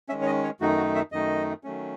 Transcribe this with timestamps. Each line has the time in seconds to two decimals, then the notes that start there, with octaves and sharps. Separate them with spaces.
0.09 D#3 G#3 C#4 E5
0.21 C#5
0.26 D#5
0.43 C#5
0.60 F#2 D#3 A3 D#4 F#4
0.77 F#4
0.95 E5
1.12 F#2 D#3 A3 D#4 D#5
1.64 D#3 F#3 A3 C#4